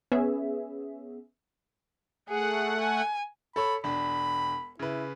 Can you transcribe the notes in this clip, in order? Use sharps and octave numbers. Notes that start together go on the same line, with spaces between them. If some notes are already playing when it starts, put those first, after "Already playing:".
B3 C#4 G#4 E5
A3 G#4 F#5
G#5
A4 C#5 B5 E6
E1 D4 B5
C#3 E4 B4